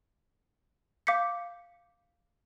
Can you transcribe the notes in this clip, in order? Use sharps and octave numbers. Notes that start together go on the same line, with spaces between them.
F5 D6 G6 B6 C#7